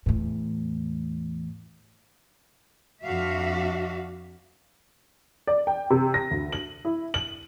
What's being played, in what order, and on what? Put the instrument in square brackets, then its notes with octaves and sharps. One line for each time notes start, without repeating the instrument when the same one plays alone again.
[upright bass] E2 A2
[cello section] F2 D4 F#4 E5 F5
[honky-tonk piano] D5
G5
C3
A#6
D2
F#7
E4
F#7